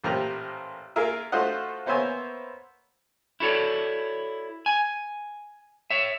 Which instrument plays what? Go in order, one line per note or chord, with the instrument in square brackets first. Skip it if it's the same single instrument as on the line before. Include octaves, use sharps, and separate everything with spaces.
[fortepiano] A1 A#2 G4 C5 A#5
A#3 F4 G#4 A#4 E5
A3 F4 F#4 C5 D#5 F#5
A#3 B3 C5 C#5 E5 G#5
[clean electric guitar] E4 F#4 A4 C#5 D5
G#5
C#5 E5